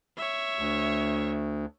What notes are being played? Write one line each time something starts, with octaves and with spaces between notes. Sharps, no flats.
C#5 E5
D2